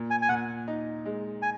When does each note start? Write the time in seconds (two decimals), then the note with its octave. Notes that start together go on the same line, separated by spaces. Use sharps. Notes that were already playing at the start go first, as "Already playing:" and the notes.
Already playing: A#2
0.10 G#5
0.22 G#5
0.29 A#2 F#5
0.68 D#4
1.05 G#3
1.42 G#5